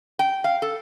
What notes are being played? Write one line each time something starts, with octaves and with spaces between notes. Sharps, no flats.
G5
F5
A4